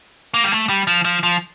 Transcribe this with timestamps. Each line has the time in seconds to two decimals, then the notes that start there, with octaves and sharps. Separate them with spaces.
0.34 A#3
0.44 G3
0.52 A3
0.69 G3
0.87 F3
1.05 F3
1.23 F3